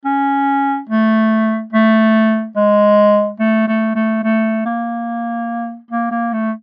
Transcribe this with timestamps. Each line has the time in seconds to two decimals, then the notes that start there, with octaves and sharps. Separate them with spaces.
0.05 C#4
0.89 A3
1.73 A3
2.56 G#3
3.39 A3
3.67 A3
3.95 A3
4.24 A3
4.66 A#3
5.91 A#3
6.11 A#3
6.33 A3